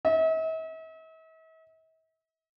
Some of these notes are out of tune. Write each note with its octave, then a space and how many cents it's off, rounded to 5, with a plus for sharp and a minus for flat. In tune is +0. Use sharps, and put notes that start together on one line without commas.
E5 -45